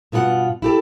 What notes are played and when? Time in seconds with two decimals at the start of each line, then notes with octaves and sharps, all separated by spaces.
0.12 G2 B2 F4 A#4 F#5
0.62 E4 G4 A4